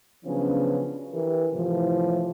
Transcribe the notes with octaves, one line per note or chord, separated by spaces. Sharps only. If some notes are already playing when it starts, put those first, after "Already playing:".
C#3 F3 F#3 B3 C#4 D4
E3 G4 A#4
A2 C3 E3 F3